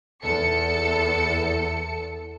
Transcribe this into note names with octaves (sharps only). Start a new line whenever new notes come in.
E2 A4 C#7